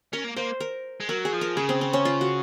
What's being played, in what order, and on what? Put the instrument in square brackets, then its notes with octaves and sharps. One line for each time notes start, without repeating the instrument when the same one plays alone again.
[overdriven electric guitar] C#4 [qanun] A#4
[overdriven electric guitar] A#3
[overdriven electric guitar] A#3 [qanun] C5
[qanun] A#4
[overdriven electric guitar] G#3
[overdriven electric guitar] F#3 [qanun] A#4
[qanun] G#4
[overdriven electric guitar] F3
[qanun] A#4
[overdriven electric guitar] C#3 [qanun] G#4
[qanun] C4
C4
C#4
F4
F#4